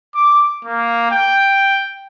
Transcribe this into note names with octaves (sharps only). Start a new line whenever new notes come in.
D6
A#3
G5